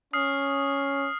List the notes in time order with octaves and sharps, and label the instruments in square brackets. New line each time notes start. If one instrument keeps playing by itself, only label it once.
[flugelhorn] C#4 [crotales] D#6 F6 C7